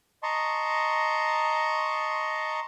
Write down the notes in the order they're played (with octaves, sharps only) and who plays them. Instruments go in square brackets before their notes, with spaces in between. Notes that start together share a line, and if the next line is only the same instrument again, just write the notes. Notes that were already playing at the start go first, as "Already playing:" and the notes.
[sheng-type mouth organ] D#5 A5 A#5 C6 C#6